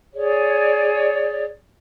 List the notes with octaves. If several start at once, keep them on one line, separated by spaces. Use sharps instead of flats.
G#4 C#5 D5